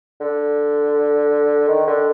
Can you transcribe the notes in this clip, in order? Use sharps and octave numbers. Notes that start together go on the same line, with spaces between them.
D3
D#3
D3